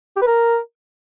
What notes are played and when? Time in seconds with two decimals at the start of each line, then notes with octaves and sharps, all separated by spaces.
0.17 G4
0.22 B4
0.27 A#4